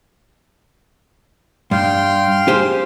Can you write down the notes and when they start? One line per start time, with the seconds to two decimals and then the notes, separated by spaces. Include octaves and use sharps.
1.71 G2 F5 G5 C6
2.48 G4 G#4 C5